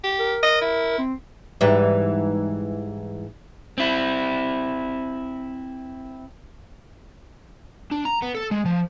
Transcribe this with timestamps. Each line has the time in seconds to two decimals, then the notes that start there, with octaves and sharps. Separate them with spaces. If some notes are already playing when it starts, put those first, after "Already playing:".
0.04 G4
0.20 A#4
0.43 D#5
0.61 E4
0.98 C4
1.61 G#2 E3 G3
3.78 C4 E4
7.92 D4
8.06 A#5
8.22 B3
8.35 A4
8.51 G#3
8.65 F3